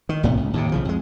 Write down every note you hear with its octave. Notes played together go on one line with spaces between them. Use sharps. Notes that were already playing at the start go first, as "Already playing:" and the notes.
D#3
A#1 A2 C3 B3
C#2
D#2 A2 C3
B1 C#3 F3
F2 G#3